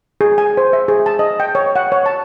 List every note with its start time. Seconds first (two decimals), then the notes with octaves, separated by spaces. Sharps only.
0.21 G#4
0.38 G#5
0.57 C5
0.73 E5
0.88 G#4
1.06 A5
1.19 D#5
1.40 G5
1.55 C#5
1.76 F#5
1.92 C#5
2.06 A5